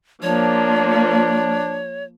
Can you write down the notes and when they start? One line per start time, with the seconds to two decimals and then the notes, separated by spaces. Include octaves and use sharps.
0.23 F3 A#3 D4 C#5